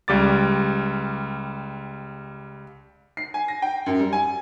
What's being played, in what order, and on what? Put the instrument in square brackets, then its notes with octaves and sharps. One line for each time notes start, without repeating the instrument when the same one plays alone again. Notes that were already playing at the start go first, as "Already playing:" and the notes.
[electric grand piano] C#2 G3 D6 A6
[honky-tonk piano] C7
G#5
A#6
G5
F#2
G3
G#5